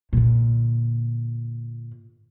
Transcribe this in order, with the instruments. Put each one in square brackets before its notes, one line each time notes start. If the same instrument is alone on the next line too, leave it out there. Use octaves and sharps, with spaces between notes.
[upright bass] A#2 D3